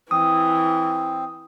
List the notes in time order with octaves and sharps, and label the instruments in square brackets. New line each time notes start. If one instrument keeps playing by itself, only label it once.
[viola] E3 [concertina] C4 [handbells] D#6